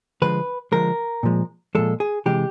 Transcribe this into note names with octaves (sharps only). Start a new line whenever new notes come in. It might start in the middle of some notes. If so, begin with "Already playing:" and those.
D3 F3 G#3 B4
D3 F3 G#3 A#4
A#2 F3 G#3
A#2 F3 G#3 A4
G#4
C3 E3 G#3 G4